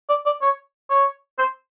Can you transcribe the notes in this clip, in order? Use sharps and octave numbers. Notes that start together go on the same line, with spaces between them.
D5
D5
C#5
C#5
C5